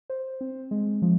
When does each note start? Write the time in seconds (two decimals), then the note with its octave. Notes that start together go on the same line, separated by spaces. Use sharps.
0.10 C5
0.41 C4
0.71 G#3
1.02 F3